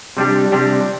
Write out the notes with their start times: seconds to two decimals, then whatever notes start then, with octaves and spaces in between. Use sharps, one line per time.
0.17 C3 G3 D4 G4
0.52 C3 G3 D4 G4